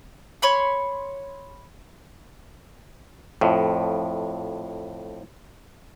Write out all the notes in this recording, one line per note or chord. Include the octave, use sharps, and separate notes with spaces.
C#5 B5 C6
F2 A2